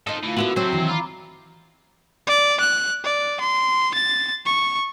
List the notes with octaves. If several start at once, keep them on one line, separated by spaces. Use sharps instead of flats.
D#4 F4 A4 D#5
D2 E3 A3 F4 F5
D3 B3 E4 F#4 A#4 B4 A5
C3 F#3 C4 C5
D#3 E3 D4
F4 A#5 B5 D6
D5
F#6
D5
C6
A6
C#6